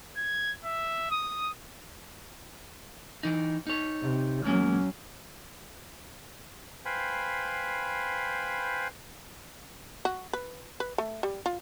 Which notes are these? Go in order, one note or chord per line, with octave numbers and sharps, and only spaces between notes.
G#6
E5
D#6
E3 D#4
D#4 C#5
C3
E2 F#3 G#3 A#3 C#4
B4 C5 F5 G5 G#5 B5
F#4
B4
B4
A3
G3
F4